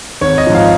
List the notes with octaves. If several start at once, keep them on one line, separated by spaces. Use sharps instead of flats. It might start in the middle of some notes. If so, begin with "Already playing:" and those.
G#1 C#5
D#5
G#2 F3
F5